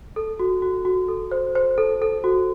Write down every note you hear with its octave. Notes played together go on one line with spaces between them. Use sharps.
A4
F#4
F#4
F#4
A4
C5
C5
A4
A4
F#4